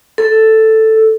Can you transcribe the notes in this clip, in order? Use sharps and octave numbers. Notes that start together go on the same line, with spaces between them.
A4